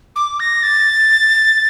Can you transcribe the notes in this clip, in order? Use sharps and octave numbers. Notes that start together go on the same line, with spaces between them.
D6
A#6
A6